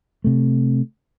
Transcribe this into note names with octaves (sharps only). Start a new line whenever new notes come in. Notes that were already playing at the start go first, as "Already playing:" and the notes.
C3 A3